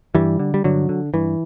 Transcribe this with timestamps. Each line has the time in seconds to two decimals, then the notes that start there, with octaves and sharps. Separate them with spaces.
0.15 G2 E3 G3
0.39 D3
0.54 G3
0.64 G2 D3 F#3
0.89 D3
1.14 G2 E3